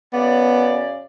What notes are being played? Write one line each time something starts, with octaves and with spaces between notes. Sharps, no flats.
F#2 C#3 B3 D5